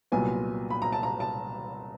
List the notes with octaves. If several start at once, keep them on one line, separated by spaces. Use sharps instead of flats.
C2 A#2 F#3 B3 G#5
B5
A#5
A5
A#5
A5